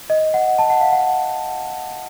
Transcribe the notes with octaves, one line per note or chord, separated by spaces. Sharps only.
D#5
F#5
A5
F#5
F5
F#5